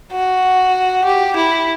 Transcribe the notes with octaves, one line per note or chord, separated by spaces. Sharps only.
F#4
G4
E4